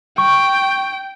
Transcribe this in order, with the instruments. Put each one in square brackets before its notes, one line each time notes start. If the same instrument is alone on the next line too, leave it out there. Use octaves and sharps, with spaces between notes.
[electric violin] G5 [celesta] C#6